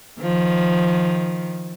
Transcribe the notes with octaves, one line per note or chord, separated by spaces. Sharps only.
D#3 F3